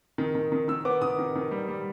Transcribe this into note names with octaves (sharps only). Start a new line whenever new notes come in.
D#3
D#3
D#3
D#3 E6
B3 D6
D#3 D#6
D#3
D#3
G3
G3